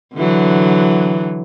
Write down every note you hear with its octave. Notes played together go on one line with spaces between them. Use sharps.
D3 E3 F#3